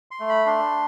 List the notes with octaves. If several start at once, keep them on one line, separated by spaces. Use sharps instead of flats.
C6
A3
B5
D4 C6